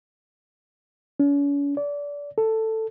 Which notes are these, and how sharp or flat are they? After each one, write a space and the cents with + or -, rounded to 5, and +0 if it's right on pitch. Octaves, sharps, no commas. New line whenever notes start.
C#4 +40
D5 -25
A4 +10